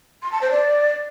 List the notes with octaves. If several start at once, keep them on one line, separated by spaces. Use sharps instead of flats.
C6
A5
C5
D5